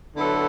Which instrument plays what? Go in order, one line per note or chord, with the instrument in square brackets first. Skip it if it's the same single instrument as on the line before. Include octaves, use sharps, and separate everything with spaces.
[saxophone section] D3 F#3 B3 E4 A4